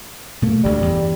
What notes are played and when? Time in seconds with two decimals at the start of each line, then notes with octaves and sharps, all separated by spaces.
0.42 B2 A3 A#3
0.64 G1 D2 D3 G3
0.80 E2 G2